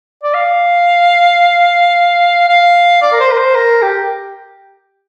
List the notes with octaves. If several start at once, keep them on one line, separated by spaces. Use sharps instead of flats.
D5
F5
F5
D5
A#4
C5
A#4
C5
A#4
G4